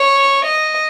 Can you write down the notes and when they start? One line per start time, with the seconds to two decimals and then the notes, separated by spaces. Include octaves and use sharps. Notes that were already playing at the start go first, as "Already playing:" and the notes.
Already playing: C#5
0.46 D#5